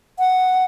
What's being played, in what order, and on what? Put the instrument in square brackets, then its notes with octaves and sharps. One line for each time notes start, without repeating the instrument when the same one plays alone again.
[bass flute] F#5